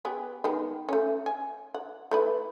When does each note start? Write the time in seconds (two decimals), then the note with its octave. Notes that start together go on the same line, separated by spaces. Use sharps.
0.05 B3 G4 G#4
0.44 D#3 G#3 B3
0.89 A3 C#4
1.26 G#5
1.74 F#5
2.11 A3 E4 B4